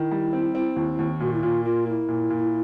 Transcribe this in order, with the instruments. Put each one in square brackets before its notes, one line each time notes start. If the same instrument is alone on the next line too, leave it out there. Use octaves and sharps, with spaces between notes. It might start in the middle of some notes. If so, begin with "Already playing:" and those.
Already playing: [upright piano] D#3 [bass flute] E4
[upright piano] G3
C4
C4
D#2
D#2
[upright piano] A#2 [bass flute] F#4
[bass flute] E4
[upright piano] A#2 [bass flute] F4
[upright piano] A#3 [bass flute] F4
[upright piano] A#3 [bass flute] E4
[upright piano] A#2
A#2